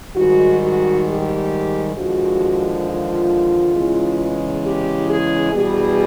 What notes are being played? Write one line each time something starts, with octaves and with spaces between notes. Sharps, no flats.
G#2 D#3 G3 F#4
F#4
G4
D#2 D3 F3 G#3 F#4
F4
E2 C#3 E3 G#3
G4
G#4
E2 B2 G3 G#4